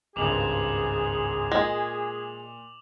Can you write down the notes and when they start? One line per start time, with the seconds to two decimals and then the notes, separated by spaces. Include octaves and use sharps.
0.16 G#1 C#2 G2 G#4 D6 F7 F#7
1.52 A#2 G#3